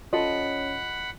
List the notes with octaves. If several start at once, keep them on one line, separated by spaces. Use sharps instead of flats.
C#4 F4 A4 D#5 F#5 B5 C6